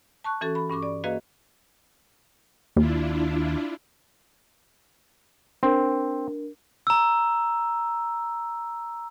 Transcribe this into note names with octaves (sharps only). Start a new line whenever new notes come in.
A5 C#6 F#6
E3 C#4 F#4 A4
B5
G2 C#4 C#6 D6
D5
A#3 F#4 G#4 B4 D#5 F5
D#2 D4 E4 F4
C4 D4 A#4
A#5 E6